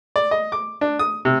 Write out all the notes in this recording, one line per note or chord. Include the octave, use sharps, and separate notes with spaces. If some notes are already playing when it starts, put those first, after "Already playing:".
D5
D#5
D6
D4
D#6
C3